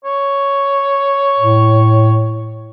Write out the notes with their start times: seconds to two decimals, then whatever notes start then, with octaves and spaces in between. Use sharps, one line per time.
0.04 C#5
1.39 A2